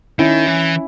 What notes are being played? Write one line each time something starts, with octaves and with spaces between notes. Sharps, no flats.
D#3 C#4 E4
E3